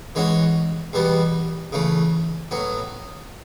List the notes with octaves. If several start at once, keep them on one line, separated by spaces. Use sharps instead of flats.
E3 G#3 C#4 F#4
E2 B2 G3 B3
C#3 E3 A3
A2 F#3 B3